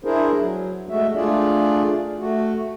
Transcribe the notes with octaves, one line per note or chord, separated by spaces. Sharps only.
D4 E4 G#4 A#4 C5
F#3
G#3 A3 F#4 E5
A3 D4 F4 G#4 D5
A3 F#4